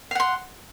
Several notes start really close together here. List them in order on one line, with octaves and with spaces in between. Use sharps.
F5 F#5 C6